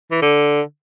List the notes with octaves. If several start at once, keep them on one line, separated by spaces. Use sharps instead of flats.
E3
D3